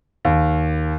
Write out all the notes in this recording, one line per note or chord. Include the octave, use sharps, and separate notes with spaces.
D#2